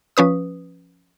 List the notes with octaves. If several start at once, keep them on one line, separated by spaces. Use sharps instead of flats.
F3 C#4 B4 D#6